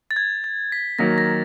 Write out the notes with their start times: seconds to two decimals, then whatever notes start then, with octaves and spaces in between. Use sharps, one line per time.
0.11 A6
0.16 G#6
0.44 A6
0.72 B6
0.99 D#3 F#3 A#3 A#6
1.18 A#6